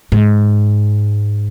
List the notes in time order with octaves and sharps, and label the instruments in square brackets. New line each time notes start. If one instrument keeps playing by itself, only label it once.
[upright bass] G#2